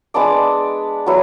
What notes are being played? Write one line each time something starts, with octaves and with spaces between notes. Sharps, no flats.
G#3 B3 D4 D6
F#3 B3 E4